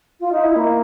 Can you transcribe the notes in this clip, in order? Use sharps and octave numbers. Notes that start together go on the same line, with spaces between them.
F4
D#4
E4
A#3